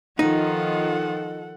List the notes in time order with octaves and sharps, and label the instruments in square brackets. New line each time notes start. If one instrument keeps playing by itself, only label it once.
[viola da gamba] D#3 F3 F4 [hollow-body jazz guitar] D#4 [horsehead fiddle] A4 F#5